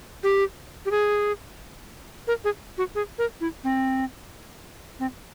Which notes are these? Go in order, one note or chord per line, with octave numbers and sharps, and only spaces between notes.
G4
G4
G#4
A#4
G#4
F#4
G#4
A#4
E4
C4
C4